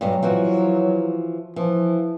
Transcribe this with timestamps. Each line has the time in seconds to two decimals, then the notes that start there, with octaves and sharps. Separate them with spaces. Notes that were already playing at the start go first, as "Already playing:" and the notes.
0.01 G2 B2 F#3 G#3
0.23 E3 F3 F#4
1.56 E3 F3